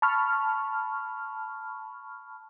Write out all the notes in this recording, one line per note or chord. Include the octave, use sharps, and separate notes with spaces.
A5 B5 C#6 F6